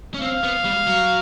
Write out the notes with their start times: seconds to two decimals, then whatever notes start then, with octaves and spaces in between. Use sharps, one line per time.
0.14 C#4
0.21 C4 F5
0.44 B3
0.65 G3
0.87 F#3